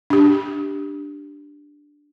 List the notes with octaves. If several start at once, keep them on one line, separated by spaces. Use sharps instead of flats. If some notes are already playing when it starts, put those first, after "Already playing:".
D4 G4